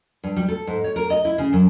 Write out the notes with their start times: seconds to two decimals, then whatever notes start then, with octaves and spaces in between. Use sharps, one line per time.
0.24 G2
0.37 G3
0.48 A4
0.67 G#2
0.84 C#5
0.96 A#4
1.10 D#5
1.25 E4
1.38 C#3
1.53 F#2